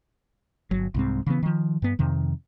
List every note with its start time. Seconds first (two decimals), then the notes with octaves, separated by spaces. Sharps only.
0.71 G1 F#3
0.94 C2 G#2 C4
1.27 C#3 E3 B3
1.43 D#3 F3
1.82 G2 B3
1.99 F2 C3 D#3